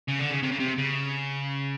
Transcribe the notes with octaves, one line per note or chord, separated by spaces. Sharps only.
C#3
D3
C#3
C3
C#3
C3
C#3